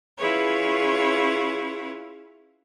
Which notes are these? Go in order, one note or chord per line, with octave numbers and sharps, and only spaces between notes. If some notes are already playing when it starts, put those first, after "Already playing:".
C#4 E4 F4 G#4 B4 C#5